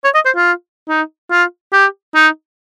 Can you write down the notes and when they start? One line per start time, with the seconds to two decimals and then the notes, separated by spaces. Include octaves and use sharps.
0.04 C#5
0.15 D#5
0.25 C5
0.36 F4
0.89 D#4
1.31 F4
1.73 G4
2.15 D#4